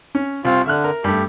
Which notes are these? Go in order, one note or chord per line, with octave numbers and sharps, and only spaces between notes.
C#4
C2 C4 F4
D3 E5 F6 F#6
A#4
G2 A3 G4